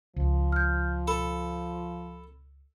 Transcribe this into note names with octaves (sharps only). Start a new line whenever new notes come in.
C#2 F3
F6 G6
A4 B5